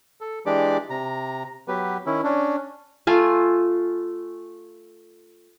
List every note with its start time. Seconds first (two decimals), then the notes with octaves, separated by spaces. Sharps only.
0.21 A4
0.46 E3 G#3 D4 G4 D5 D6
0.90 C3 A#5
1.68 F#3 B3 G4 B4
2.06 D#3 C#4 E4
2.24 C#4 D4
3.07 A3 F4 G#5